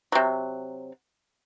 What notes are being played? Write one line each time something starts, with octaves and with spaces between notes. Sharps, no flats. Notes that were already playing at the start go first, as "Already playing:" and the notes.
C3 F#3